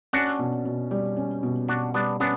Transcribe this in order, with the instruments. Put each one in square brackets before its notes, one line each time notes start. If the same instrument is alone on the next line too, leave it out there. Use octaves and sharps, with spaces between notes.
[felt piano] C#4 [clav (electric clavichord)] D4 F#4
[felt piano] B2
B2
G3
C#4
B2
[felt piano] B2 [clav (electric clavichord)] D4 F#4
[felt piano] G3 [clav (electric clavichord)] B3 D4
[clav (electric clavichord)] B3 D4 [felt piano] C#4